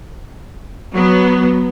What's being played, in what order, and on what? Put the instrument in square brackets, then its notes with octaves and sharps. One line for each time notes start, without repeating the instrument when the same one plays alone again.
[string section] F#3 B3